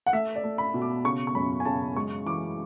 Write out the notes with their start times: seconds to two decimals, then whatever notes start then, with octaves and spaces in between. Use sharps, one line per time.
0.06 F#5
0.13 A3 E5
0.36 D5
0.44 A3
0.58 B5
0.74 B2
0.81 D6
1.04 C#3 C#6
1.27 C#6
1.35 F#2 B5
1.60 G#5
1.65 C#3 A5
1.96 G#3 C#6
2.26 E3 D6